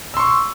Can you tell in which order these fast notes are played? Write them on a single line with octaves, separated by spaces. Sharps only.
E6 C6 C#6